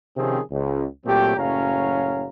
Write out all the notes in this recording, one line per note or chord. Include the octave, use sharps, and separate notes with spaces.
C3 D#3 F3 C4 C#4 G#4
C#2
A#2 F#3 A3 C4 G4
F#1 A2 F#3 C#4 F5 A#5